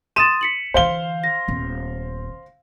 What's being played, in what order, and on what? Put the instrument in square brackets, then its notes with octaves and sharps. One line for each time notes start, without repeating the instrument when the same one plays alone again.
[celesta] C6 D#6 A6 [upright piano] D#7 E7
[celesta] B6 C#7 F#7
[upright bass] D3 E3 [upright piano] C5 F5 G7
[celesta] A#6
[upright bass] D#1 B3